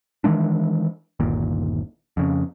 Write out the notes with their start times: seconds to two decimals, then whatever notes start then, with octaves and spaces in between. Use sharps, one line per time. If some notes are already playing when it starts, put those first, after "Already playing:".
0.24 D#3 E3 G#3 D4
1.20 G1 D#2 A#2
2.17 F2 C#3